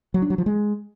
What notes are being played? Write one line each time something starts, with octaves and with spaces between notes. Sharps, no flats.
F#3
D4
F#3
F3
G#3